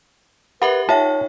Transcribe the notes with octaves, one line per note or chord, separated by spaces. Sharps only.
G4 A#4 B4 E5 F#5 B5
D#4 F4 C#5 E5 G5 A5